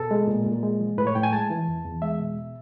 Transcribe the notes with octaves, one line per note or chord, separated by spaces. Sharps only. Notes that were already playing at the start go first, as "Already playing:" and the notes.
Already playing: B2 A4
G#3
A#2
A#2
G#3
F3
A2 B4
C#5
A2 G5
G#5
G#3 A5
E3
E2
E2
G#3 E5
B2